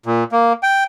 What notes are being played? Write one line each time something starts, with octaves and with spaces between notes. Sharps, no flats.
A#2
A#3
G5